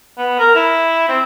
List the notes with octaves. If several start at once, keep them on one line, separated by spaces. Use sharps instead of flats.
B3
A#4
E4
C4